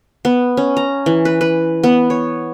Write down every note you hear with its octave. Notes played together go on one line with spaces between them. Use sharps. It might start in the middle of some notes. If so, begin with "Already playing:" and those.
B3
C#4
A#5
E3
B4
B4
B3
C#5